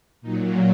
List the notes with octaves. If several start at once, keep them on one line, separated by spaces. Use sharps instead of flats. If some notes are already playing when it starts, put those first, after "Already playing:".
A#2 F#3 D#4